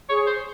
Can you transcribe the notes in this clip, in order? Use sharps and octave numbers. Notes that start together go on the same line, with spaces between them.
G#4 C#5
C5